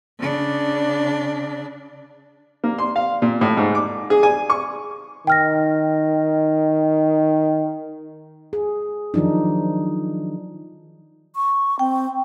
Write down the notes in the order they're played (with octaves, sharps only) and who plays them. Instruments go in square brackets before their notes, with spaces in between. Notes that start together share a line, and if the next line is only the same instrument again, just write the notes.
[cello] C#3 D4
[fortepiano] A#3
C6
F5
A#2
A2
G#2
D6
G#4
G#5
C#6
[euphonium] D#3 [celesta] G5 F6 A#6
[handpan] G#4
D#3 F3 F#3 D4 D#4
[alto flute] C#6
[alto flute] C4 [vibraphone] G5